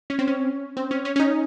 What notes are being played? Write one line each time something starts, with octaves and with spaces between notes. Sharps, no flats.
C#4
C4
C#4
C4
C#4
C#4
C#4
D#4